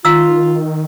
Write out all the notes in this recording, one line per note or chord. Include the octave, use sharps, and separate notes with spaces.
D#3 F4 F5 A#5 E6